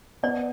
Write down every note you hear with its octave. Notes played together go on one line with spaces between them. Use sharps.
B3 D5